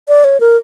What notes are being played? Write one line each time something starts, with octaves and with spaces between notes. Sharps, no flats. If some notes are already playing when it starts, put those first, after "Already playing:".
D5
C#5
A#4